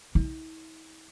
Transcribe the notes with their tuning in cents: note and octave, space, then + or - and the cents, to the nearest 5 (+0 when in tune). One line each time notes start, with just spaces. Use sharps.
E4 -45